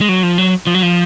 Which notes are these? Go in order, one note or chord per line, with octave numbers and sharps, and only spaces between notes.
G#3
F#3
F3
F#3
F3
F#3
F3